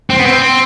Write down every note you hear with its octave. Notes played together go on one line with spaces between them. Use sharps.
C4
B3
C4